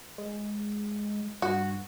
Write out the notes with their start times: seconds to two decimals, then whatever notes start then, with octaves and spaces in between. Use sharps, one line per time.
0.18 G#3
1.42 G2 F#4